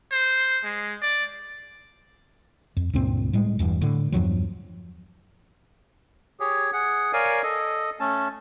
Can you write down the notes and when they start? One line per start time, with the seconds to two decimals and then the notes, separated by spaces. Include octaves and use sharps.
0.12 C5
0.64 G#3
1.02 D5
2.77 F2
2.93 C#2 G2 A#2 C4
3.33 A2 G3 G#3
3.59 E1 E2 G2
3.81 A2 D3
4.12 E2 G2 F3 F#3
6.40 G4 G#4 C#5
6.73 G#4 F#5
7.13 A#4 C#5 D5 F5 G#5
7.43 A4 D#5
8.00 A3 C#4 A5